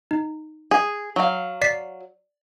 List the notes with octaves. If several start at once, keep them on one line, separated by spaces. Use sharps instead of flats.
D#4
G#4
F#3 F5
D5 B6 C7